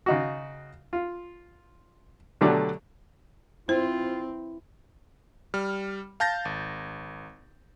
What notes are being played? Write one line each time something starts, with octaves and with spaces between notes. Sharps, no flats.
C#3 D#4 F#4
F4
B2 D3 F#3 A3 G4 D5
C4 E4 F4 C5
G3 F6
F5 A5 G6 A6 A#6
G#1